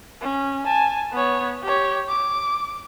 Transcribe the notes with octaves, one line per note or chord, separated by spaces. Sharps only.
C#4
G#5 A5
B3 C#5
G4 C#5
D6